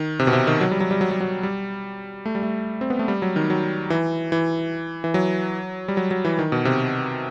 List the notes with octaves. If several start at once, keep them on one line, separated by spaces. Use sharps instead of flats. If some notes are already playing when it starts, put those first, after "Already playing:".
Already playing: D#3
C3
B2
C3
D#3
F#3
G3
F#3
G3
F#3
G3
F#3
G3
A3
G3
A3
C4
B3
A3
G3
F#3
D#3
F#3
E3
E3
E3
F#3
G3
F#3
F#3
E3
D#3
B2
C3